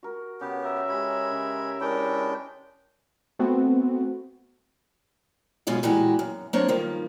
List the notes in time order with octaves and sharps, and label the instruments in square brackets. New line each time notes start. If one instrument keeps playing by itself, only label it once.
[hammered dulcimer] F#4 A#4
[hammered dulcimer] C#3 [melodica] B3 G4
[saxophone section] A#4 E5
[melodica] G#3 C#5 B5 [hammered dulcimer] G4 B4
[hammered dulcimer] C#3
[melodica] G#3 D4 G5 [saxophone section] E4 A#4 [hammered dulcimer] C#5 E5
[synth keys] A3 B3 C4 F#4
[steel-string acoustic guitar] F#2 B2 G#3 C#4 F4
A#2 E3 G#3 F#4 G4
F#2
F#3 A#3 C4 D4 C5 C#5
G2 D#3 F3 A#3